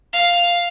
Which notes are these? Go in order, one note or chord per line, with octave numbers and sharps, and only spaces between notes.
F5